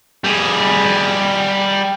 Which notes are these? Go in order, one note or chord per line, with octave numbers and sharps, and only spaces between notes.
G3 G#4